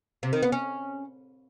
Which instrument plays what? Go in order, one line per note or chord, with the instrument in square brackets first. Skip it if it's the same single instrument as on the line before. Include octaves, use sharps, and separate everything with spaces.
[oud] C3
D#3
B3
C#4